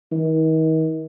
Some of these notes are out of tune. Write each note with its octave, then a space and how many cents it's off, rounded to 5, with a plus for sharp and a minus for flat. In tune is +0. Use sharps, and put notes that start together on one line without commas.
D#3 +40